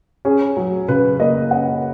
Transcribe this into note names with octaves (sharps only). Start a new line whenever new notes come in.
C#4 G#4
F#3
C#3 B4
A#3 D#5
C#4 F#5